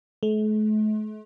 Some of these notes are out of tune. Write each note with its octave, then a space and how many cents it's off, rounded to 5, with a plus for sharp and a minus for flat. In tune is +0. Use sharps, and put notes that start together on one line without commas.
A3 -45